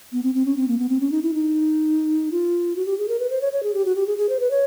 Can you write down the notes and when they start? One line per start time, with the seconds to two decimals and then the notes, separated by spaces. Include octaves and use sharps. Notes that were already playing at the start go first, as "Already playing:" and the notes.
0.12 B3
0.23 C4
0.35 C4
0.45 C#4
0.57 C4
0.68 A#3
0.78 B3
0.89 C4
1.00 C#4
1.11 D#4
1.22 E4
1.34 D#4
2.32 F4
2.76 F#4
2.86 G4
2.98 G#4
3.08 A#4
3.19 B4
3.30 C5
3.41 C#5
3.52 C#5
3.63 G#4
3.74 G4
3.85 F#4
3.95 G4
4.07 G#4
4.17 G#4
4.29 C5
4.40 B4
4.51 C#5